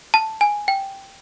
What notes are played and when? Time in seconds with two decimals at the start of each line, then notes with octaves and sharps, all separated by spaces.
0.14 A5
0.41 G#5
0.68 G5